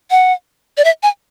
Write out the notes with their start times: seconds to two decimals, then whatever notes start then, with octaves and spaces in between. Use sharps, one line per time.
0.11 F#5
0.77 D5
0.84 E5
1.03 G#5